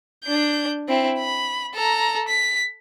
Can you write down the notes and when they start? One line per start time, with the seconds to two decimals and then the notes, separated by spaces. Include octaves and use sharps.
0.25 D4 G6
0.88 C4 E4
1.19 B5
1.74 A4 A#5
2.28 B6